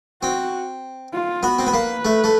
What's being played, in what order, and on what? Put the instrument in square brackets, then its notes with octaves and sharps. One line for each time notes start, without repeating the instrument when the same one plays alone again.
[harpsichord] C4 [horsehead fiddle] F#4
[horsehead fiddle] F4
[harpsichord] B3 [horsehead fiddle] F#4
[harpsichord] C4
B3
[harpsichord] A#3 [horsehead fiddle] B4
[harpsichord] A3
A3